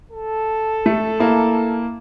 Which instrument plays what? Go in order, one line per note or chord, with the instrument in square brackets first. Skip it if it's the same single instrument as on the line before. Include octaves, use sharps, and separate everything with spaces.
[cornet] A4
[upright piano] A3
A#3 E4